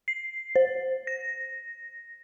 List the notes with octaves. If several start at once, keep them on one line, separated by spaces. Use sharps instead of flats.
C7
C5
A#6